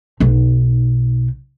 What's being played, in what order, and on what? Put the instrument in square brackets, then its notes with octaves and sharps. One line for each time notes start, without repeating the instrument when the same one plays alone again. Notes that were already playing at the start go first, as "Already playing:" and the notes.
[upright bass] B1 D#4